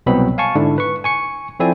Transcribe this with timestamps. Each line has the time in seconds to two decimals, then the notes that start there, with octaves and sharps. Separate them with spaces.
0.06 C2 B2 F#3 B3 C4 B5
0.38 F5 G#5 A5 C#6
0.55 G#2 D3 D4 E4
0.78 B4 C#6
1.04 G#5 C#6 C#7
1.60 F3 C4 E4 A4 D5 G#5